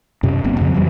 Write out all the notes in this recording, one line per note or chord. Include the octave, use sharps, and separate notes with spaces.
F#2 C3
G1 F#2 A#3 C4
F2 C#3 F3 F#3
F#2 E3 G3